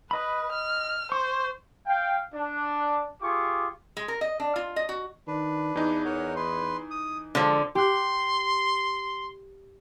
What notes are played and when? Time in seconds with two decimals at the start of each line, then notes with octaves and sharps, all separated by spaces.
0.11 B4 D#5 B5
0.52 F6
1.12 C5 C#6
1.86 F5 G5
2.34 D4
3.22 F4 G4 G#4 C#6 D6
3.97 G#3
4.08 A#4
4.21 D#5
4.40 D4
4.56 F4
4.76 D#5
4.89 F#4
5.27 D#3 D4 B4
5.76 E2 E3 D#4
6.05 A#4 C#5 F#5
6.36 B4 C6
6.91 D#6
7.35 D3 F3 G#3 A4
7.75 G4 C6 F#6